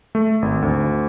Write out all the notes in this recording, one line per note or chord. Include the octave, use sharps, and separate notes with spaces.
A3
G#1
D2